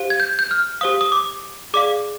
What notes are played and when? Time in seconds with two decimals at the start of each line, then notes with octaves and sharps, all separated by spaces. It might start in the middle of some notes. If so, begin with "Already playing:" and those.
Already playing: G4 C5 F5
0.10 G#6
0.20 G6
0.39 G6
0.51 F6
0.81 G4 C5 F5 D#6
1.01 D#6
1.12 D6
1.74 G#4 D5 F5 D6